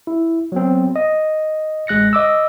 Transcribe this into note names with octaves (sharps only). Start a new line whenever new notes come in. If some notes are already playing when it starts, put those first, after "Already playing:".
E4
F#3 B3 C4
D#5
A1 G#3 F#6 A#6 C#7
D#5 D6 E6